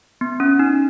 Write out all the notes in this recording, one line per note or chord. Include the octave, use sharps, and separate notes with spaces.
B3
C#4
D#4